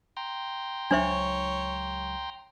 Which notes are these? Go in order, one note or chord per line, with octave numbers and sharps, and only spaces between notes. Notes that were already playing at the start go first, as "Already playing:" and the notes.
G5 A#5 C6
C#2 F#3 D4 C5 C#5 E5